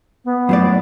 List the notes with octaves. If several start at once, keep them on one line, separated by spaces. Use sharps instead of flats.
B3
F#2 A2 D5